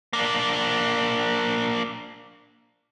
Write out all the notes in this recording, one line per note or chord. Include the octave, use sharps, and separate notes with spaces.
A#3 D4